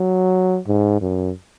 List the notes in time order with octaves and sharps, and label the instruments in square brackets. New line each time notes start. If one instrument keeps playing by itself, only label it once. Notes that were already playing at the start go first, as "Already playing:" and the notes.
Already playing: [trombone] F#3
G#2
F#2